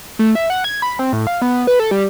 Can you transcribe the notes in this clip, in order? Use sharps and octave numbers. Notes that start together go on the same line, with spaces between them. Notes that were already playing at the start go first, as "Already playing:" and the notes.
A3
E5
F#5
G#6
B5
C4
A2
F5
B3
B4
A4
G3